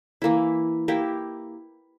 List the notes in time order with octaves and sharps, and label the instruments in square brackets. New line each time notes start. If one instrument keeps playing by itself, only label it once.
[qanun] E3 A#3 E4
A#3 E4 G4